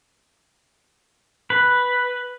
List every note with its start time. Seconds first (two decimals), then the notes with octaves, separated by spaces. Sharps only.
1.50 B4